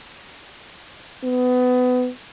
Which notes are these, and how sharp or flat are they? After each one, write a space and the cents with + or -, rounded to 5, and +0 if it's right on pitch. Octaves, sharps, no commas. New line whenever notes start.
B3 +25